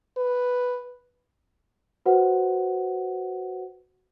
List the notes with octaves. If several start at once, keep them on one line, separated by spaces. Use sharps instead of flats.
B4
F#4 B4 C5 F#5